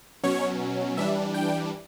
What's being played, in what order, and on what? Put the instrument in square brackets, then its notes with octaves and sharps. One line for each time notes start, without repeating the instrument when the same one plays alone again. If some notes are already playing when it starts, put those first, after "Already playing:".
[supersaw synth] B2 F#3 C#4 C#5
E3 G3 D4 E5
G5